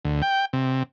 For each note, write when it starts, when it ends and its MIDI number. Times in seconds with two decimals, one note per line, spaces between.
0.05 0.22 38
0.22 0.45 79
0.53 0.83 48